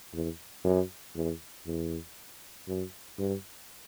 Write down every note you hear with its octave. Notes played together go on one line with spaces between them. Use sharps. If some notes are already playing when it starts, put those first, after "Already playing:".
E2
F#2
E2
E2
F#2
G2